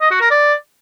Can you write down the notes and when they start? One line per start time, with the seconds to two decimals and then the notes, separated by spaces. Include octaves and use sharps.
0.01 D#5
0.11 F#4
0.21 A#4
0.30 D5